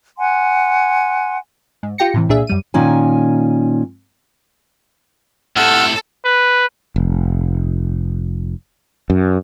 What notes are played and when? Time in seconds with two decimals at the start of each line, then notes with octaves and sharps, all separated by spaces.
0.17 F#5 G#5 C6
1.83 G#2
1.98 F4 G4 G5 A#6 C#7
2.14 A2 C3 E3
2.29 C2 A#2 D4 G#4 E5
2.47 F#2 G3 D#7
2.74 A#2 D#3 C#4 G#5
5.56 A2 C3 A4 F#5 E6 F6
6.24 B4
6.96 F1
9.10 F#2